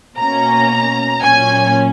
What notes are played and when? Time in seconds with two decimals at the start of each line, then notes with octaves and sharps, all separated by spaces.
0.18 B2 A#3 C#4 A#5
1.21 A#2 F#3 C#4 G#5